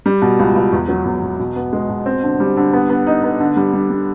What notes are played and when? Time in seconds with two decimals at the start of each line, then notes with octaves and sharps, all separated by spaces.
0.06 G3
0.22 B2
0.39 C#2
0.56 C#2
0.72 E2
0.88 F#3
1.05 E2
1.22 E2
1.39 B2
1.56 B3
1.73 G#3
1.89 B2
2.06 C4
2.23 D3
2.40 G3
2.57 D3
2.73 B3
2.89 B3
3.07 D#4
3.24 B3
3.40 D3
3.57 G3
3.73 G3
3.90 G3